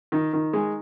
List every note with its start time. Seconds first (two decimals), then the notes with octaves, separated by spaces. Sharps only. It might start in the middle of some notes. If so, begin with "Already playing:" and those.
0.12 D#3
0.33 D#3
0.53 G#3